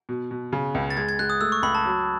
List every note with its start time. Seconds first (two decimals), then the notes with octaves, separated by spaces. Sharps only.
0.09 B2
0.31 B2
0.53 C#3
0.74 C#2
0.90 A6
0.97 G#3 G#6
1.09 G#6
1.19 G#3 F#6
1.30 D#6
1.41 A3 E6
1.52 C#6
1.63 C#2 B5
1.75 A5
1.85 F#3